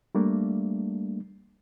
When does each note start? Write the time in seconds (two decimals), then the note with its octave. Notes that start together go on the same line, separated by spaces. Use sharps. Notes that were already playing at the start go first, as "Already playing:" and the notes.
0.15 G3 A3 A#3 D4